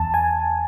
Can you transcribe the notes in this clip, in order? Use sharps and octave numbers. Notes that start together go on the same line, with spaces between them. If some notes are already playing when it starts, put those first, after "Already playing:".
Already playing: E2 A5
G#5